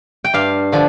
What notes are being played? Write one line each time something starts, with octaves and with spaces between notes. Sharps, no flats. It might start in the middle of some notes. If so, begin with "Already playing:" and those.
G5
G2 F5
D3 F3